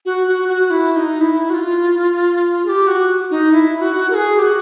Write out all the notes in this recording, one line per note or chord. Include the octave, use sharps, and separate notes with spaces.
F#4
F#4
F#4
E4
E4
D#4
E4
F#4
F4
G#4
G4
F#4
D#4
E4
F#4
A#4
G#4
G4
F#4